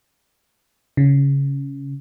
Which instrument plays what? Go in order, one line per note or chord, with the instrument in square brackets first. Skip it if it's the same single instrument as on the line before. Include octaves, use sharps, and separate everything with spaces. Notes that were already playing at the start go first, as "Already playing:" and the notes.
[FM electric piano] C#3